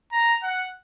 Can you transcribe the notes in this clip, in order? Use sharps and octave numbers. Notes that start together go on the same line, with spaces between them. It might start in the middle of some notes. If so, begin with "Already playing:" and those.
A#5
F#5